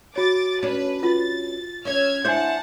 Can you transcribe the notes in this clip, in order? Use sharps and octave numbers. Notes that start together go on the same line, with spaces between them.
F#4 C#5 D6 A6
C#4 D4 B4
F4 A6
C#4 C#5 E6 F6 G#6
D4 E4 C5 F#5 G#5 A5 G6